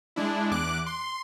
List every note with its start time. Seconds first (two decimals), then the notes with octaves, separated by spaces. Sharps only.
0.16 G#3 D4 E4
0.51 E2 D6 F#6
0.86 C6